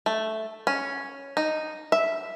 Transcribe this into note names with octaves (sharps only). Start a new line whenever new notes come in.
A3
C#4
D#4
E5